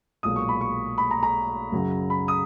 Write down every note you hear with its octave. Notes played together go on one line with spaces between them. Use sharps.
B1 A#2 G#3 D#6
C#6
B5
C#6
B5
A#5
A#5
F#2 C#3 F#3
B5
D#6